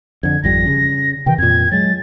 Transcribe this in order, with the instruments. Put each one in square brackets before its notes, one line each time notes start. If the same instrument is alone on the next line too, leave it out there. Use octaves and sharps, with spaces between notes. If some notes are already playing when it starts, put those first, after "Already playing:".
[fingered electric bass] F2 D3 [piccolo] G#6
[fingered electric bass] G#1 F2 G3 [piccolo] A#6
[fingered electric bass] C#3 C#4
[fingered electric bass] C3 D#3 E3 [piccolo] G5
[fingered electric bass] F2 A#2 [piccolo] G#6
[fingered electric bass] F#3 G#3 [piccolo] A6